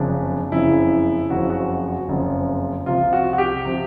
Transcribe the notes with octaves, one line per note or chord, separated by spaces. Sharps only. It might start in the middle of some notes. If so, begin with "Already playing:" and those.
Already playing: F#1 F2 C#3 F3 D4
F#1 F2 C#3 F3 E4
F#1 F2 C#3 F3 F#4
F#4
F#4
F#1 F2 C#3 F3
C2 C3 F3 F4
F#4
F#4
G4
C3 F3